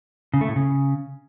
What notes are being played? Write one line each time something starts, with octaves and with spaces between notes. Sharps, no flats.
C#3
A3
A2
C#3